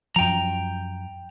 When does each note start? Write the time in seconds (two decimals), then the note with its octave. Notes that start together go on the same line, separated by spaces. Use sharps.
0.16 F#2 F3 G5 A#5